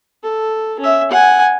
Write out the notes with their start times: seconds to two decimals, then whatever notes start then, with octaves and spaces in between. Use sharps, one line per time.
0.23 A4
0.79 C#4 E5
1.11 F#5 G#5